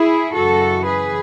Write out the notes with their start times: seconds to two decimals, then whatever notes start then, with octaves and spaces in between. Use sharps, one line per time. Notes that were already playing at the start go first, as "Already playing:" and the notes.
Already playing: E4 G#4
0.34 F#2 C#3 E3 F#4 A4
0.84 G#4 B4